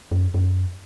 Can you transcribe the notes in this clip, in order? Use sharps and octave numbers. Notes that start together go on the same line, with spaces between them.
F#2
F#2